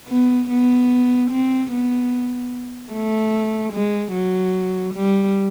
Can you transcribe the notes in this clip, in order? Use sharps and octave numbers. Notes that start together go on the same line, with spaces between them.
B3
B3
C4
B3
A3
G#3
F#3
G3